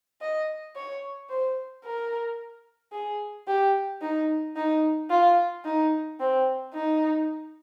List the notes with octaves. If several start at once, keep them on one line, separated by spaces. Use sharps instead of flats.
D#5
C#5
C5
A#4
G#4
G4
D#4
D#4
F4
D#4
C4
D#4